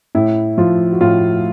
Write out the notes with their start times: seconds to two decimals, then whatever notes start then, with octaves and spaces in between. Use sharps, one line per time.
0.15 A2 E4
0.58 F3 F4
0.92 F#4
1.01 A2 F4